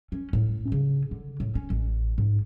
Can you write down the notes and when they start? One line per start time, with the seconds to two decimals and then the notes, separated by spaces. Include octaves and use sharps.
0.12 C#4
0.33 A2
0.72 C#3
1.11 D3
1.40 A2
1.55 C#4
1.70 A1
2.18 G#2